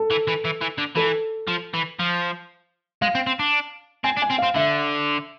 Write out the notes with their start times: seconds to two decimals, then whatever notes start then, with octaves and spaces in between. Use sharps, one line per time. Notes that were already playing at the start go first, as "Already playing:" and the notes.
Already playing: A4
0.11 E3
0.28 E3
0.45 E3
0.62 E3
0.78 D3
0.96 E3 A4
1.48 F3
1.74 E3
1.99 F3
3.02 G#3 F5
3.15 C4
3.27 C4
3.39 D4
4.04 C4 G#5
4.17 D4
4.22 G#5
4.31 C4
4.38 F5
4.43 C4
4.56 D3 E5